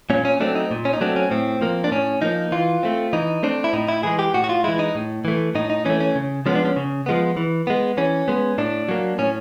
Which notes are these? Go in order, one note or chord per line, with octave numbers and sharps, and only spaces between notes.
A#2 C#4
C#4
F#3 A3 C4 D4
D#4
A#2
C#4
D#4
F#3 A3 C4 D4
C#4
A2 C4
F3 A#3
D4
A2 C#4
F3 A#3 D#4
E3 F4
A3 C4
E3 D#4
A3 C4 D4
E4
A2 D#4
E4
E3 G#3 G#4
G4
A2 F#4
F#4
F4
E3 G#3 E4
D#4
A2
E3 A3
A2 D#4
D#4
E3 A3 C#4
C#4
C#3
F3 G#3 B3 C#4
D4
C#4
C#3
F3 G#3 B3
E3
G#3 B3
E3 C#4
G#3 B3
A2 D4
F#3 A#3
A2 C#4